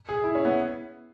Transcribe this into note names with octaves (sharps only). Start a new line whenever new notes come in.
G#4
E4
C#4
B3